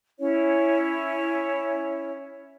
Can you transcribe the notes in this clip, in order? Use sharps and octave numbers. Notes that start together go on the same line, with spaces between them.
C#4 E4 C#5